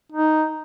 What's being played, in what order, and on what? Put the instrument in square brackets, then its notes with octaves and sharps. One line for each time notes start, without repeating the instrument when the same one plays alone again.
[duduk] D#4